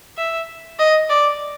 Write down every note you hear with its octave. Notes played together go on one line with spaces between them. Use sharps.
E5
D#5
D5